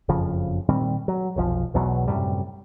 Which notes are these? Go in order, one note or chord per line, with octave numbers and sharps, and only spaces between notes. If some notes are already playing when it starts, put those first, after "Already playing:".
F#1 F2 C#3 F3
A#2 D#3 G3 C4
F#3
F1 B1 F3
B1 E2 B2 F#3
F#2 A2 C3 G3